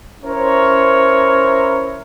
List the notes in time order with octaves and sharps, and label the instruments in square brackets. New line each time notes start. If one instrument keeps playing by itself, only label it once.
[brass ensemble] C#4 E4 A#4 C5 C#5